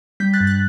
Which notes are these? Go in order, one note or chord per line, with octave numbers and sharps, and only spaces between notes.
G3 G6 B6
F#6 A6
G2
F#6 A6